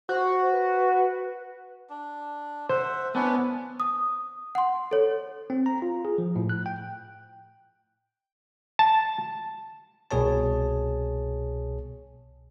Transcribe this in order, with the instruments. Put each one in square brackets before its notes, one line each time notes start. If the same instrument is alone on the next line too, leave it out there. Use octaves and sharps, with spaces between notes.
[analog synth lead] F#4 [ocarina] C5
[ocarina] B4
[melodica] D4
[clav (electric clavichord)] C5 [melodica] E5 F#5
[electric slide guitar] B3 [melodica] C#4 D4 E4
[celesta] D#6
F#5 C6
A4 C#5
[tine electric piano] C4
A#5
F4
G#4
F3
A2
F#6
G5
[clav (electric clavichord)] A5
[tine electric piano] C2 B2 G#4 C#5 A5